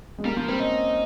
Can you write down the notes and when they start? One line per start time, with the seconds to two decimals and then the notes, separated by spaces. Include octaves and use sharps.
0.18 G#3
0.25 G3 A#3
0.37 F3 A#3
0.48 G3 C4
0.60 C#4 D#4